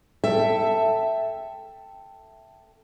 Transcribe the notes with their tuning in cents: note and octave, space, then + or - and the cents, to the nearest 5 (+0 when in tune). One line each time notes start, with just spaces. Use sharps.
A4 +10 E5 +0 G5 +5